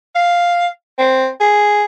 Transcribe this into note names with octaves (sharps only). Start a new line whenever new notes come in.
F5
C4
G#4